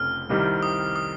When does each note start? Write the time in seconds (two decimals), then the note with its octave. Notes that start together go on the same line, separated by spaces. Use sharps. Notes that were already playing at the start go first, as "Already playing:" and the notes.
Already playing: F1 F2 C#3 F6
0.29 C2 C3 D#3 G3 C4
0.63 D#6
0.96 D#6